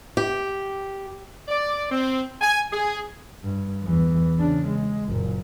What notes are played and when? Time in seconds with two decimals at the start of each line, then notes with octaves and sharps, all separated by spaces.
0.17 G4
1.48 D5
1.91 C4
2.42 G#5
2.72 G#4
3.44 G2
3.83 E2 E3
4.38 C#3 D4
4.68 G#3
5.08 F#1 A#2